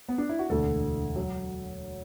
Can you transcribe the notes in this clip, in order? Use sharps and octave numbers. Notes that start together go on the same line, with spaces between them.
B3
D4
E4
F#4
E1 D2 D3 A4
F#3